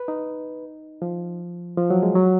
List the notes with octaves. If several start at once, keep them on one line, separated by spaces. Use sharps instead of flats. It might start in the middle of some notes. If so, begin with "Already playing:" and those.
Already playing: B4
D#4
F3
F3
F#3
G#3
F#3